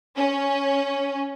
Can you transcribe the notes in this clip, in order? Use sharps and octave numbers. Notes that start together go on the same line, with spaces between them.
C#4